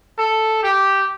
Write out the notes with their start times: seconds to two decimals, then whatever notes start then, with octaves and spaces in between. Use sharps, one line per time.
0.18 A4
0.63 G4